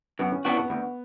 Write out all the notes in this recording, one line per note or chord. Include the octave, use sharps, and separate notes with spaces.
F#2 B3
C#4
E3 B3 C#4 D4 F#4
B3
D2 B3